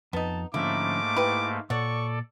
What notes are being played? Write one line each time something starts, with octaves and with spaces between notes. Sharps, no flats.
F2 B3 D#4 A5
G#2 D3 F3 A3 A#3 C#4 E4 D6
E4 G4 B4
A#2 A4 C#5 D5 F#5 C#6